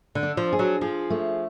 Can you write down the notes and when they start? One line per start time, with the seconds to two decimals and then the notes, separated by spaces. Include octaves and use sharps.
0.15 D3
0.23 D4
0.37 F3
0.53 G#4
0.59 F#3
0.81 F3 G#4
1.10 A3